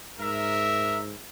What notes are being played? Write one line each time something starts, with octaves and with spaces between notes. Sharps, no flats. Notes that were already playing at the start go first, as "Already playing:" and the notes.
G#2 A#4 E5